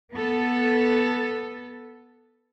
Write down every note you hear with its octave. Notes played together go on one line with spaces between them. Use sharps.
B3 A4